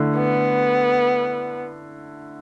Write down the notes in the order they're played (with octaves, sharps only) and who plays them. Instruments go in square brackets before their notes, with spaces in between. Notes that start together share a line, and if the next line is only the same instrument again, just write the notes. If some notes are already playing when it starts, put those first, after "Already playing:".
Already playing: [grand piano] D3 A3 E4
[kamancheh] B3